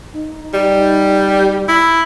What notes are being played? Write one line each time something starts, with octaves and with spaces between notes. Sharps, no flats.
D#4
G3
E4